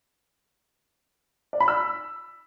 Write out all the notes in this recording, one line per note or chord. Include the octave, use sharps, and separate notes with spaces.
D5
B5
E6